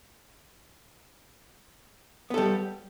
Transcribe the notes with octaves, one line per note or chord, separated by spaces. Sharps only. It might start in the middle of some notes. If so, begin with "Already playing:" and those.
G3 B3 A4